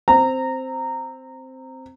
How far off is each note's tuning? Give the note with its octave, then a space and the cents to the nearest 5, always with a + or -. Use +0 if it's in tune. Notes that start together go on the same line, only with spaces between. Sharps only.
C4 +0 A#5 -20